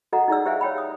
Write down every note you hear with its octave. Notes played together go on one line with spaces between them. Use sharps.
F#4 A4 D#5 F#5 A#5
D#4 E4 G#4 D5 E6
G4 C5 E5 F5 G5 G#5
C#5 G5 B5
D#6